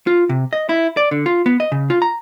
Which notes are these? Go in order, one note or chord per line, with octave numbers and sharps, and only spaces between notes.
F4
C3
D#5
E4
D5
D3
F4
B3
D#5
C#3
F4
A#5